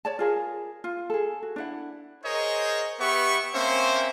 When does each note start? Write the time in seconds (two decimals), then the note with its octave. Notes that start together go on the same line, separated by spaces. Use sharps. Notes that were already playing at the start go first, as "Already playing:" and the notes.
0.05 C#5 D5 A5
0.19 F4 G#4 A#4
0.84 F4
1.10 G#4 A4
1.43 F#4
1.56 D4 E4 F#5
2.24 G#4 A#4 C5 C#5 D#5
2.99 B3 G4 B4 E5 F#5 C#6
3.53 A#3 C4 C#4 C5 E5 C#6